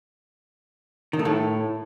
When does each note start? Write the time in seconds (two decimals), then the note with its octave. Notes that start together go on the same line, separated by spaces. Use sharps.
1.13 D#3
1.19 A3
1.25 A2